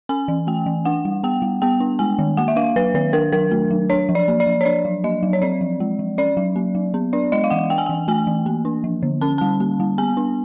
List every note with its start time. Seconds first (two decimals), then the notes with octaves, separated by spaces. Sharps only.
0.09 C#4 G#5
0.28 E3
0.47 A3 G5
0.66 E3
0.85 D4 F#5
1.05 G3
1.23 B3 G5
1.42 G3
1.62 B3 G5
1.80 D4
1.99 G#3 G#5
2.19 D#3
2.37 A#3 F#5
2.48 E5
2.56 D4 F5
2.76 F#3 B4
2.94 D#3 B4
3.13 D4 A#4
3.32 F#3 A#4
3.51 A3
3.70 F#3
3.89 D4 C#5
4.09 F3
4.15 D5
4.28 A#3
4.40 D5
4.47 F3
4.61 C#5
4.65 D4 D5
4.85 F#3
5.04 A#3 D#5
5.23 F#3
5.33 C#5
5.42 C4 D5
5.61 F3
5.80 G#3
5.99 F3
6.18 C#4 D5
6.37 F#3
6.56 A#3
6.75 F#3
6.94 B3
7.13 D4 D5
7.32 G#3 D#5
7.44 F5
7.50 E3 F#5
7.70 D4 G5
7.78 G#5
7.86 G5
7.89 E3
8.08 A3 G#5
8.27 E3
8.46 A#3
8.65 D4
8.84 F3
9.03 D3
9.21 C#4 A5
9.38 G3 A5
9.60 A#3
9.80 G3
9.98 B3 G#5
10.17 D4